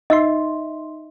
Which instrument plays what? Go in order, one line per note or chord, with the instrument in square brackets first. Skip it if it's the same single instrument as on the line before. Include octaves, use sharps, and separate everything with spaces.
[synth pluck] D#4 E5 C6 [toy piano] D#5